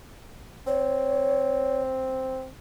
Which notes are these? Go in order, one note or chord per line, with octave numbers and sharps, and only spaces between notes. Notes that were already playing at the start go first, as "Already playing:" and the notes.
C4 C#5